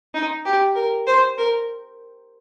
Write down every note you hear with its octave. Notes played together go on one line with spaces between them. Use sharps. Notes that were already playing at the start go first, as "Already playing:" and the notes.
D#4
G4
A#4
C5
A#4